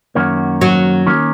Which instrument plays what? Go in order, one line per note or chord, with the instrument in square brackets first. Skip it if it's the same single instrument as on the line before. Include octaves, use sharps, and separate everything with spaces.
[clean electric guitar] F#2 D#3 A#3 C#4 F#4
[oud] F#3
[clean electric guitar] D#3 A#3 C#4